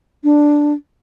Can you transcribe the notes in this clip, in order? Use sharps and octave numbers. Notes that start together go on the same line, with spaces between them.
D4